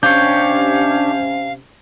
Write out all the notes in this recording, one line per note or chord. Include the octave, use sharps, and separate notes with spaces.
C3 C#4 D4 G4 C#5 F5 G6